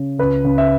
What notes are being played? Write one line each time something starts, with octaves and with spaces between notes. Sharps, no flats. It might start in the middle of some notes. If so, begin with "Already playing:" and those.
Already playing: C#3
C#2 B4
C#2
E5